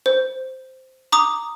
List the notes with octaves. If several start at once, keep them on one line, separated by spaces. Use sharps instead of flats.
C5
A#5 D6 D#6